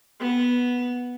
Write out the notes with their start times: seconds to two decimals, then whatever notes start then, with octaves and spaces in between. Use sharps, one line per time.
0.20 B3